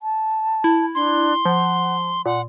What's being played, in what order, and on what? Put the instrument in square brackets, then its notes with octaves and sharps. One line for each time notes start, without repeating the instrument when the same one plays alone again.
[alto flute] A5
[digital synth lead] E4
[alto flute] D4 [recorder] C6
[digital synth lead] F3 [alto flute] F#5
[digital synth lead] A#2 [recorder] F#5 [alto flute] C6